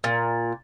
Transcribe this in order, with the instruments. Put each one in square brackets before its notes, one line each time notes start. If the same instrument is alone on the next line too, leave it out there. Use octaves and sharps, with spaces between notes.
[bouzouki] A#2